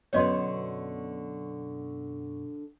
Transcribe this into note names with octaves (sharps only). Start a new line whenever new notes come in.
F#2 B2 D3 B3 C#5 D#5 C6 C#6